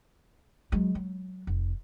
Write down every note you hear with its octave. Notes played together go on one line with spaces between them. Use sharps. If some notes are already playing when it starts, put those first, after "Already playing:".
F#3 G#3
F#3
F1